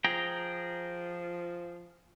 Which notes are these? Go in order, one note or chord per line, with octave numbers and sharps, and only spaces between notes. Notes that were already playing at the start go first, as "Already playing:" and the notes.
F3 G#4 G5 A#5